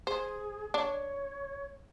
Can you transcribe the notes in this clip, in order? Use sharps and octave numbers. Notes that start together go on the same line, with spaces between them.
G#4 C5
D4 C#5